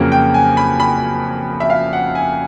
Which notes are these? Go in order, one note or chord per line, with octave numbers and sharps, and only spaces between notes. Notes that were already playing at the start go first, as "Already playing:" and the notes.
Already playing: F2 C#3 F#3 A#3
G5
G#5
B5
B5
E5
F5
F#5
G#5